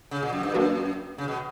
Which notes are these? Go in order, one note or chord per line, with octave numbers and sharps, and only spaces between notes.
C#3
A#2
F#2
G2
F#2 A#3 D4 F#4 B4
C#3
B2